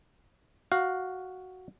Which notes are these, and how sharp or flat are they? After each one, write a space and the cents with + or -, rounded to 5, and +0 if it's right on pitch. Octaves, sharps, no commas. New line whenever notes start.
F#4 +0 F5 +10